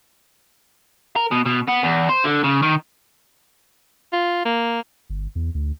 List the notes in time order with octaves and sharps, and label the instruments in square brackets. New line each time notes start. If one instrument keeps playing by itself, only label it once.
[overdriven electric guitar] A#4
B2
B2
B3
E2
C5
D3
C#3
D#3
[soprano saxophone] F4
A#3
[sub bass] G1
E2
D2